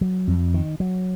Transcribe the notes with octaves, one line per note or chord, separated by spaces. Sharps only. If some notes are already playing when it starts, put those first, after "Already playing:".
F#3
F2
D#3
F#3